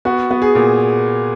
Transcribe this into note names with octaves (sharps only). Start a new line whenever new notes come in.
B3 F#4
B3
G#4
A#2